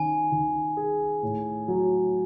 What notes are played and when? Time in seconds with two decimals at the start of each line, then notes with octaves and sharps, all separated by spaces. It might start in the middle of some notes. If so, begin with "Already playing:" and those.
Already playing: D#3 C#4 G#5
0.32 D#3
0.77 G#4
1.23 A2
1.68 F#3